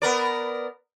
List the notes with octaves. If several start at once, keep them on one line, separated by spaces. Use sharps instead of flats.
B3 A#4 D5